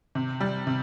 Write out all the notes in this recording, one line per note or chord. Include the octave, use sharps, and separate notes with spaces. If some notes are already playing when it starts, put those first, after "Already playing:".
C3
G3
C3